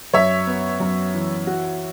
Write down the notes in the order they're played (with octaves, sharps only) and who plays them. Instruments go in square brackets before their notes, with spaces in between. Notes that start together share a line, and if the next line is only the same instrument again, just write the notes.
[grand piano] F#2 [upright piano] C#5 E5
[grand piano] B3
F#2
E3
F#4